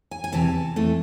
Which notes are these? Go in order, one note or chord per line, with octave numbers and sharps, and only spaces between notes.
G#5
G#5
E2 C3 E3 A5
F2 E3 A3